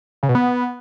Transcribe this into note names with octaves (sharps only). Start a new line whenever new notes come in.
C#3
B2
B3